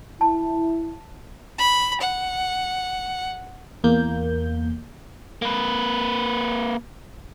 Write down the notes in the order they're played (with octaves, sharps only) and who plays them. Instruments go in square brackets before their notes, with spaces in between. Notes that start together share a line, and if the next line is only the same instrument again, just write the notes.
[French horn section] E4 [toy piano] A5
[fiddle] B5
F#5
[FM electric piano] E2 A#3 G6
[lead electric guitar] A#3 B4